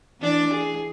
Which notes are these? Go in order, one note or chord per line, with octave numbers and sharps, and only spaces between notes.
E3 D4 D5
G#4